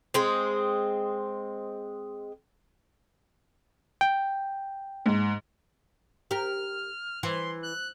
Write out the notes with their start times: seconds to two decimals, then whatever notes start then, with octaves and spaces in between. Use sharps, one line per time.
0.14 G#3 C4
4.01 G5
5.06 G#2
6.31 G4 A#4 F6
7.23 E3 C6
7.63 F#6